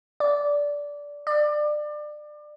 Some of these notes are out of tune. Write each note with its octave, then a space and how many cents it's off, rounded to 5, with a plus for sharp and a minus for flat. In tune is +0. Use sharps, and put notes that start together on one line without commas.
D5 -15
D5 +25